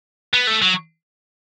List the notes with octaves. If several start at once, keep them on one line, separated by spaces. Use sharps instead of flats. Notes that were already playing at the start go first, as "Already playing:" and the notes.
B3
A3
F#3